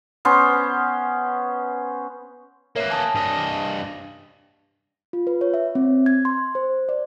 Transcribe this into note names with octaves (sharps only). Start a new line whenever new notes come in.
B3 C#4 C5
A#3 A#4 B4 C#5 E5
G#5 A5 D#6
G2 D#5
F4
B4
C#5
E5
C4
G#6
C6
C5
D5